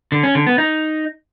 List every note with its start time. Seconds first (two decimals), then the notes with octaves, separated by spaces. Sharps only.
0.12 D3
0.23 C#4
0.35 D3
0.47 B3
0.58 D#4